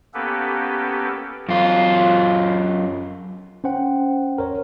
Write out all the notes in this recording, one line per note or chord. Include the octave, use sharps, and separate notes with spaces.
A#3 B3 C#4 G4 A4 B4
F#2 F4
C#4 C5 F#5 G5
A#4 C5 C#5